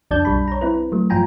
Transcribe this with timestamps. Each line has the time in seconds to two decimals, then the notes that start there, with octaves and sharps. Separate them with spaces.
0.11 C2 F2 D4 D5 A5 G6
0.25 B1 G3 B5
0.48 C#5 A#5
0.61 C4 E4 B4
0.92 F#3 A3
1.10 G2 F3 F4 G5 G#5 A#5